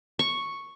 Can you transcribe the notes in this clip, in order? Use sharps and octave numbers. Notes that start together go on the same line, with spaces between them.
C#6